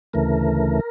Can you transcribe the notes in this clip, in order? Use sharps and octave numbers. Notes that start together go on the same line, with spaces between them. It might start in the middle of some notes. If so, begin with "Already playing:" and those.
D2 C#3 E3 A3 A#4